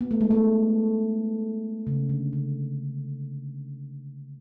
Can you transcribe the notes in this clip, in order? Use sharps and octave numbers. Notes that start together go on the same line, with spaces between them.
B3
A3
G#3
A3
C#3
D3
C#3